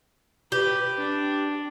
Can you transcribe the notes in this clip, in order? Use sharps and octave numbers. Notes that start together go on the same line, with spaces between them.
G4 B4
D4